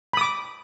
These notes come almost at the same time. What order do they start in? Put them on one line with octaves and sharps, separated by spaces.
B5 D#6 D6